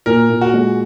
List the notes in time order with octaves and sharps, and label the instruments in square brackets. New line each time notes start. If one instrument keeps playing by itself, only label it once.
[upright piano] A#2 [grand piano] A#4
[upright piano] A#2
[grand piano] F#4
[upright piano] G#3